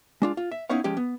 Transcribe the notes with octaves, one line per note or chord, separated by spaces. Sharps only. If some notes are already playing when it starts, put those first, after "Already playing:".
G#3 D4 F4
F4
E5
B3 C#4 D#4 E4 C#5 F5
F3 G#3 C#4 G4
B3